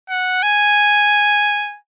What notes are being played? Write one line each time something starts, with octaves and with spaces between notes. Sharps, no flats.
F#5
G#5